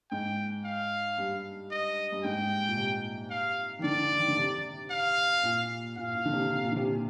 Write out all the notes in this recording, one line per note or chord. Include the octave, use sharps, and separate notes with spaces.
G#2 G5
F5
G2
D#5
G2
G#2 G5
A#2
C3
F5
D#3
D3 D5
D#3
D3
C3
F5
A#2
A#2 F5
A#2
D3
C3
C3
A#2
D3
C3
A#2